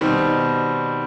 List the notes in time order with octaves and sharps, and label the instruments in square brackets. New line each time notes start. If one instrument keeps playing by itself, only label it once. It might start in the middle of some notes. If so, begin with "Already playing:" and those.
[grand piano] B2 D#3 G3 C4